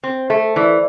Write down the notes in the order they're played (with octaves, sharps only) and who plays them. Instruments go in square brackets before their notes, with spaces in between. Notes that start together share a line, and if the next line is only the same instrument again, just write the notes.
[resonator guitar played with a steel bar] C4 [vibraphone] C5
[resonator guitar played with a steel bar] A3
[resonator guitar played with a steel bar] E3 [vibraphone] D5